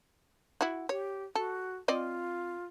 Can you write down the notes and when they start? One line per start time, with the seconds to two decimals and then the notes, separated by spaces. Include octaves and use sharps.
0.61 E4 F#4
0.89 G4 C#5
1.35 F#4 A4
1.88 C4 F4 D5 D#5